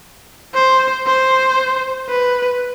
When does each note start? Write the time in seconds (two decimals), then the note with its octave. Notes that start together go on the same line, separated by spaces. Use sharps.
0.54 C5
1.07 C5
2.09 B4